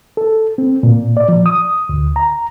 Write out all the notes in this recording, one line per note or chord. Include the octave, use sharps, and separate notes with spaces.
A4
C4
A#2
D5
F3
D#6
D2
A#5